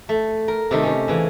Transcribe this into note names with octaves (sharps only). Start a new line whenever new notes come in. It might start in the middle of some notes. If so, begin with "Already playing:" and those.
A3
A#4
C3 D#3 A3
C3 C#4
C#3 E3